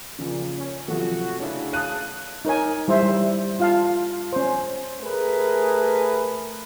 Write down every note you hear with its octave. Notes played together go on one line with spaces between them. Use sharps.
A#2 C#3 F3
C#4
C3 F3 F#3 A3 F#4
C#3 C#4 D4 E4
F5 A5 D#6 F#6 D#7
D#4 A#4 C#5 G#5
G3 E4 C5 E5
G3
F4 F5 A5
C#4 C5
A3 G#4 A#4 B4